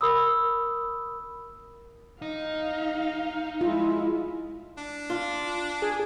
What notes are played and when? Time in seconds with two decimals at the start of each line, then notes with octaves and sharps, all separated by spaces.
0.01 A#4 B5 D#6 E6
2.22 D#4 F5
3.61 G#3 E4 F4
4.77 D4
5.10 F4
5.82 G#4